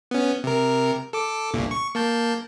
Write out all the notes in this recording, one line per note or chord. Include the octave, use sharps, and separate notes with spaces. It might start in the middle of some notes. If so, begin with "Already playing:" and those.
B3 C#4
C3 A#4
A4 D6
G1 C2 A#2
C#6
A#3 A5 G6